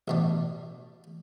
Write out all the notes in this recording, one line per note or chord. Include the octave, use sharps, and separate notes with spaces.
A1 B2 D4